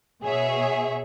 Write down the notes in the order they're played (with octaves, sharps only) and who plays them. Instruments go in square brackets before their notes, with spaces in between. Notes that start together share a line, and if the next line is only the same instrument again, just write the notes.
[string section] B2 G#4 C#5 E5